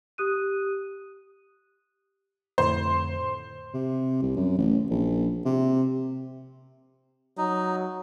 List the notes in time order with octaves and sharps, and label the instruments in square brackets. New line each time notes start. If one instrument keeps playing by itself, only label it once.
[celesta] G4 D#6 F#6 D#7
[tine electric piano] F2 A2 D3 [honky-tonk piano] C5
[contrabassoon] C3
C2
F#2
A1
A#1
C3
[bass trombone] F#3 [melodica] D#4